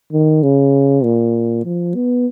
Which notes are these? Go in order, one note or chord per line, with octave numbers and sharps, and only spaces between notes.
D#3
C#3
A#2
F3
B3